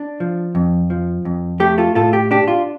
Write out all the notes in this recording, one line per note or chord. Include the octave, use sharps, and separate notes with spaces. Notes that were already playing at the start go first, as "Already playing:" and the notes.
Already playing: D4
F3
F2
F3
F2
A3 G4
F4 A4
A2 F4 A4
G4
D4 G4
F4